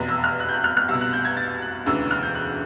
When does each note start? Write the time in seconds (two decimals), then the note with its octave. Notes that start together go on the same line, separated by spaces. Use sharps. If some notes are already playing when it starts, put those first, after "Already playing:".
Already playing: F1 E2 B2
0.09 E6
0.24 F6
0.40 F#6
0.49 G6
0.53 F#6
0.64 F6
0.77 F6
0.88 C2 B2 E6
1.01 F#6
1.13 G6
1.25 G#6
1.37 A6
1.62 F#6
1.86 E1 D2 C#3 E3 E6
2.11 F6
2.23 G6
2.35 F#6